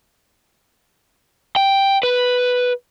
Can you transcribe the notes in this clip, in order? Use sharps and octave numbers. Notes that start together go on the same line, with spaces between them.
G5
B4